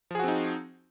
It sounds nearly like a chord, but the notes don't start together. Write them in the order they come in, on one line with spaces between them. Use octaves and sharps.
F3 G#4 F#4 C4 D#4